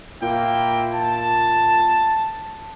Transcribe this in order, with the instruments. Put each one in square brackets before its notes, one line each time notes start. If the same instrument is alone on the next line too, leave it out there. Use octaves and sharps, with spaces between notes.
[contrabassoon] A#2 [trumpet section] A#3 E4 G5
[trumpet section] A5